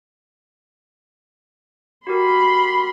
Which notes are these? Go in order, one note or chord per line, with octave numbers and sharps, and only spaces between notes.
F#4 G4 A#4 B5 C6